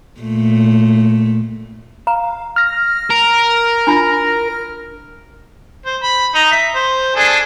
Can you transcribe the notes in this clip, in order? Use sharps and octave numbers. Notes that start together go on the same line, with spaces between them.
A#2 A3
F5 A#5
F6 A#6
A#4
D4 E4 F4
C5
B5
D#4 A#5
E5
C5
D4 G#4 A4